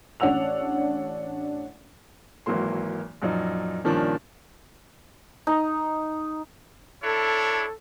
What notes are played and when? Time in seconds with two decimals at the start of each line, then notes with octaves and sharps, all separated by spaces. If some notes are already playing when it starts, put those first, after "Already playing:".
0.20 A1 D4 C#5 F#5 E6 F7
2.46 G#1 E3 F#3 A#3 C6
3.22 A#1 F#2 D#4
3.84 G2 A#2 D#3 F3 C#4 D4
5.47 D#4
7.03 D4 E4 A4 C#5